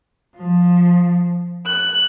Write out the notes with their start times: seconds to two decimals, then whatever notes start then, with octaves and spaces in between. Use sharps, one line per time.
0.36 F3
1.65 F#6